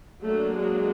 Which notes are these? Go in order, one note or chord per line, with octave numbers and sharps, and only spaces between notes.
F#3 A3 A#3 D4 A4
G#3 G#4